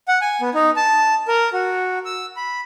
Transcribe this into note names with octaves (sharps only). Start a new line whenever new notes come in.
F#5
G#5
B3
D#4
A5
A#4
F#4
E6
B5